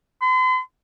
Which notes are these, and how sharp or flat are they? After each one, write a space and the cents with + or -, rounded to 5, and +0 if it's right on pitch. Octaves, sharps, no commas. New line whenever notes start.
C6 -45